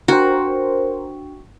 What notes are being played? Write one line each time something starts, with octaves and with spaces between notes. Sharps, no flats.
D4 F#4 A#4 C5 G5